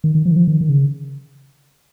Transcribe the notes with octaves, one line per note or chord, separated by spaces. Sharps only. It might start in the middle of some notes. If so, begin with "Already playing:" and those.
D#3
D#3
F3
D#3
F3
D#3
D#3
C#3